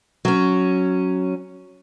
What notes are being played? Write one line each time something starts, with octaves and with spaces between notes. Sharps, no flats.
F#3 C#4